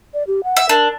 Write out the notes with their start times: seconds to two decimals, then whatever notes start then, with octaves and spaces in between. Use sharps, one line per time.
0.14 D5
0.27 G4
0.44 F#5
0.57 E5
0.69 D4 A#4